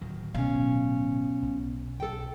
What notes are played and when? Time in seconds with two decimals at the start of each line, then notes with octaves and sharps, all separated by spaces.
0.01 D1 D#3 F#3
0.35 B2 C#4 F5
1.42 B1
2.00 B1 A4 G5